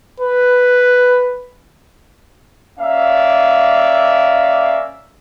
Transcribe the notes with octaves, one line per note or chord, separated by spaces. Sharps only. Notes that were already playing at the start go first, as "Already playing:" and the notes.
B4
A#3 C#4 D5 E5 F5